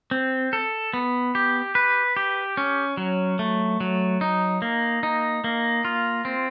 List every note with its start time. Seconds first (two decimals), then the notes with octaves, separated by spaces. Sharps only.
0.11 C4
0.53 A4
0.94 B3
1.35 G4
1.75 B4
2.17 G4
2.57 C#4
2.97 F#3
3.39 A3
3.81 F#3
4.21 D#4
4.62 A#3
5.03 D#4
5.44 A#3
5.85 F4
6.25 C4